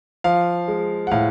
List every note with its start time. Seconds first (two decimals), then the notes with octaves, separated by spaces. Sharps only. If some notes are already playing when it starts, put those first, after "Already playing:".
0.24 F3 F5
0.68 G#3
1.07 F#5
1.11 A2 F5